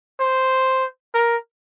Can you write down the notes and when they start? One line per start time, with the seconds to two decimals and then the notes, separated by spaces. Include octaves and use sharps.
0.20 C5
1.14 A#4